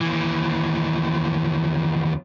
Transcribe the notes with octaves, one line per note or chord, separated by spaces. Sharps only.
D#2 E3